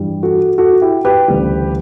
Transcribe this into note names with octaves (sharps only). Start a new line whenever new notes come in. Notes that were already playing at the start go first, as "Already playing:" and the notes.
Already playing: G2 E3 G3
F#4 A4
F#4 A4
E4 G4
G4 B4
D2 C#3 E3 G3